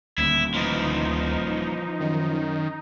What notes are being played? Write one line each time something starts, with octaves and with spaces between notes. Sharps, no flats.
D#1 D2 E4
E3 F3 D#4
F#2 D#3